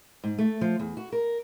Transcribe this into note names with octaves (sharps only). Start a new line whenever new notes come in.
G#2
A3
F3
E2
F#4
A#4